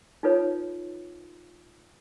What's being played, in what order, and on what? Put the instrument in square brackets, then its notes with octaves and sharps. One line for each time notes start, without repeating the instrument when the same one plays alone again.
[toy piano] D#4 F4 A4 B4 C#5